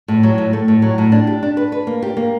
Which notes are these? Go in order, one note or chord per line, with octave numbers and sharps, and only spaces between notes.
A2
F#3
A2
A3
A2
F#3
A2
D4
G4
D4
B4
B4
A#3
G4
A#3